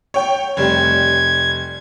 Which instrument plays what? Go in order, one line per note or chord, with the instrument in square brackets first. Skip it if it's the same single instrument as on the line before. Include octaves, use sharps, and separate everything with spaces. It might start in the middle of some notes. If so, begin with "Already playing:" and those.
[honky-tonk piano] C#5 G5
[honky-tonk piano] F1 G3 [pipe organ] G#6